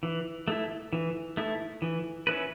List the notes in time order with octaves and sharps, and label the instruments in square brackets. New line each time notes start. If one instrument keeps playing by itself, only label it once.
[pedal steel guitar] E3
A3 E4
E3
A3 E4
E3
C#4 E4 B4